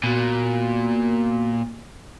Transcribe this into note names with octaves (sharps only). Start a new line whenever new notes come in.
A#2 B3 F#4